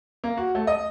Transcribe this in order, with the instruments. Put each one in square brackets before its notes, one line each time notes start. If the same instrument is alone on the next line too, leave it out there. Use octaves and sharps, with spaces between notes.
[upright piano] A#3
F#4
A3
D#5